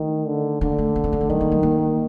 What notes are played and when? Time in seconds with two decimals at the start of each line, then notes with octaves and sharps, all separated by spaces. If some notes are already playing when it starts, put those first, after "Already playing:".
Already playing: D#3 A3
0.27 D3
0.61 D3 A#3
0.78 A3
0.96 A#3
1.04 C4
1.12 A#3
1.21 A3
1.30 D#3 G3
1.41 A#3
1.51 G3
1.63 A#3